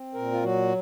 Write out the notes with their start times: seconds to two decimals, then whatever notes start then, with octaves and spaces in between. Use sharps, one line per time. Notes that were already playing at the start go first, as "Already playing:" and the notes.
Already playing: C4
0.14 A#2 A#4
0.32 F4
0.43 F#3 F#4